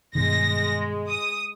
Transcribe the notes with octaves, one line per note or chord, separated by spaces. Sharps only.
G2 B2 D#3 G#3 A#6
D#6